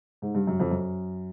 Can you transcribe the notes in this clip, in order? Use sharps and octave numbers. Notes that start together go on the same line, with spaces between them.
G#2
G2
F#2
F2
F#2